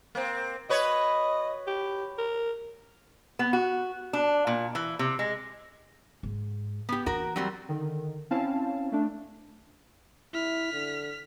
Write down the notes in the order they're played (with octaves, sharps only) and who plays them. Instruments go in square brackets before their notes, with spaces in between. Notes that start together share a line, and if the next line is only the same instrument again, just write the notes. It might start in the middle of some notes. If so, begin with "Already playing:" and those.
[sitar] A#3 C4
[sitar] F#4 B4 C#5 [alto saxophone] D#5
[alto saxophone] G4
A#4
[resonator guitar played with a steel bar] B3
F#4
D4
A#2
E3
C3
G#3
[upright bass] G#2
[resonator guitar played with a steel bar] B3 G4
[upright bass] E3 A#3 [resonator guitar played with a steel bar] F#4 A#4
[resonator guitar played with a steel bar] F#3 G3 C4
[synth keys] D3 D#3
C4 C#4 E4 F5 A5
A3 D4
[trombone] E4 [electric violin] F6 B6
[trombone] D3